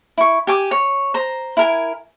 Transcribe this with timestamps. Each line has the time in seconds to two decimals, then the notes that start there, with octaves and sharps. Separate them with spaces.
0.18 E4 C#6
0.47 G4 G#5 D6
0.71 C#5
1.14 C5 A#5
1.57 E4 A#4 G#5